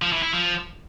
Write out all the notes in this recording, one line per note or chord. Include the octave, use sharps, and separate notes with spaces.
F3
E3
E4
F3